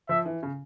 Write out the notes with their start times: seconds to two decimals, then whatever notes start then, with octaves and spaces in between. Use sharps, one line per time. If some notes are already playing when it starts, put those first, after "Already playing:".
0.09 F3 E5
0.26 E3
0.43 C#3